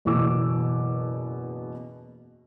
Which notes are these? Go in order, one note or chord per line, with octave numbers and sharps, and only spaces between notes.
F#1 E2 B2 E4 D6 E6